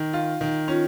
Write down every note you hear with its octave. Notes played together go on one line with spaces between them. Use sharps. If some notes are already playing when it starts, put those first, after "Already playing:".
Already playing: D#3
F4
D#3
C#4 F4